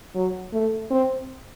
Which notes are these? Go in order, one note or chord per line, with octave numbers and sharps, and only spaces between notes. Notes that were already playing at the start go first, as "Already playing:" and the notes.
F#3
A3
C4